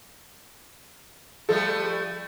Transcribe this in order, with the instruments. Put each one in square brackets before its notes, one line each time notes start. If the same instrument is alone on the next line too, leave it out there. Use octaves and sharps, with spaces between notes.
[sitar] F3 G3 A3 [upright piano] A4